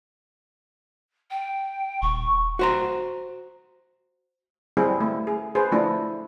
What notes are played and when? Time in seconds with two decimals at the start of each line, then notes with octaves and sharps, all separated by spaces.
1.30 G5
2.02 D#1 C#6
2.59 F#4 C5 A#5
4.77 G3 C4 E4 G#4
5.00 A3
5.27 G#4
5.55 G#4 B4 C5
5.72 F3 A3 D4 E4